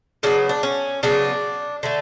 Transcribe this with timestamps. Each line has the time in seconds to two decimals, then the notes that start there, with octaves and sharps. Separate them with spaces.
0.23 C#3 F#3 B3 D4
0.49 D4
0.63 C#4
1.03 C#3 F#3 B3 D4
1.83 D3 A3